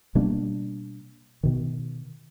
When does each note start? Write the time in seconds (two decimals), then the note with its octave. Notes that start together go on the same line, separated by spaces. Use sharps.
0.15 B2 G3 A#3 D4
1.43 B2 D#3